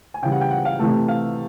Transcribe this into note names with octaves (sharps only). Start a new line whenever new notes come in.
G#5
C#3 E3 G3 G5
F#5
G5
F#5
F5
C3 E3 A3
F5